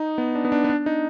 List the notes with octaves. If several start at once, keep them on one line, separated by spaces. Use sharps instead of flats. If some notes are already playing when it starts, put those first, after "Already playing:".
Already playing: D#4
B3
D4
B3
D4
B3
D4
D#4